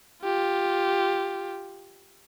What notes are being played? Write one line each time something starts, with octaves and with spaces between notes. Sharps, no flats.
F4 G4